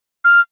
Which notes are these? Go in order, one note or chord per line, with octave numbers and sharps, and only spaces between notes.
F6